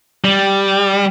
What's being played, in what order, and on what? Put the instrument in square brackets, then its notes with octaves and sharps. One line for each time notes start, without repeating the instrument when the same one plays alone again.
[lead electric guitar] G3